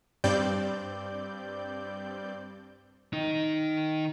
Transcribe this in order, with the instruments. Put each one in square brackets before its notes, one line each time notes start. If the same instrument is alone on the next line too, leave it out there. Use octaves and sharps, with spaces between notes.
[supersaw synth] G2 G3 C4 D5 G6
[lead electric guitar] D#3 D#4